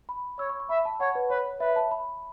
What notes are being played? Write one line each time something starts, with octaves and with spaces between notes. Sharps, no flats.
B5
C#5 E6
C#6
C#6
E5 B5
A5
C#5 F#5
B4
B4 C#5
B4 E5
A5
B5